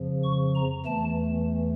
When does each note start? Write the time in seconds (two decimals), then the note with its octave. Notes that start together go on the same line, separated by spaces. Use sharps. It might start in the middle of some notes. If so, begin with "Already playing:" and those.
Already playing: F2 C#3 F3
0.24 C#6
0.55 A#5
0.85 E2 E3 A3 A5